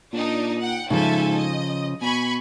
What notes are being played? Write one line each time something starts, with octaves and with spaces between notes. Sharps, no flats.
A#2 D4 D#4
F#5 G5
G#2 C#3 F3 A4 E5 G#5
D#5
B2 G#5 B5 C#6